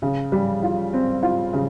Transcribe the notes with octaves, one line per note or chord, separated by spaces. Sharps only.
C#3
G3
F4
C4
F4
C#3